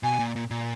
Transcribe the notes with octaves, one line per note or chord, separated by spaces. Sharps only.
B2 G#5
A#2
A#2
A#2